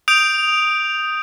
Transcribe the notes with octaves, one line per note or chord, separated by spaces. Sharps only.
D#6 G6 D7 F7